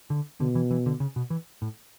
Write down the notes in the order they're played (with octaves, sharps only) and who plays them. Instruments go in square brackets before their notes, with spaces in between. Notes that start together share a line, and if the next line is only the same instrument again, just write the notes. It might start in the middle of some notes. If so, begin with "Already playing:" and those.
[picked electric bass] D3
[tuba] B2 [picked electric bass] D3
[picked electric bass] E3
E3
D3
C#3
B2
E3
A2